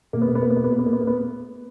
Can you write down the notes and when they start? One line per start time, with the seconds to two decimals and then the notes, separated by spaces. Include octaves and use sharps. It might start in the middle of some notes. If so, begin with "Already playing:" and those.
0.13 B2 A#3
0.22 B3
0.28 A#3
0.35 B3
0.42 A#3
0.50 B3
0.56 A#3
0.63 A#2 B3
0.72 A#3
0.79 B3
0.86 A#3
0.93 B3
1.00 A#3
1.07 B3